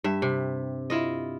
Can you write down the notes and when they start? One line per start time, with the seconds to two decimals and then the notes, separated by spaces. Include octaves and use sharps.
0.04 G2 E5
0.22 C3
0.90 E4 F4 D#5